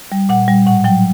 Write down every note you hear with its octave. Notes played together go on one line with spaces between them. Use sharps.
G3
A#2 F#5
G3
A2 F#5
F#3 G5